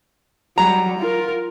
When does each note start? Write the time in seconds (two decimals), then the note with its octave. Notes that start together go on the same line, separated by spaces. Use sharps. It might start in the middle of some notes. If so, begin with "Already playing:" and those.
0.58 F#3 G3 A#5
0.99 F4 A#4